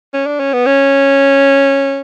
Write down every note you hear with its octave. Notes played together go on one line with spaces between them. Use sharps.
C#4
D4
C#4
B3
C#4